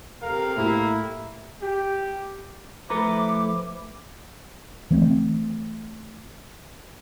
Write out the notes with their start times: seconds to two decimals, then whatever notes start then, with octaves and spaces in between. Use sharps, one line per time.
0.23 C3 A4 A#4 F5
0.57 A2 A#3 E4 G4
1.61 G4
2.90 F3 A3 E4 A4 B4 A#5 D6
4.91 E3 A3 C4